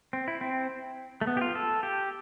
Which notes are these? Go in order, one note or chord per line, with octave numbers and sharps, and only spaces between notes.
C4
E4
C4
A3
B3
G4
F4
A4
G4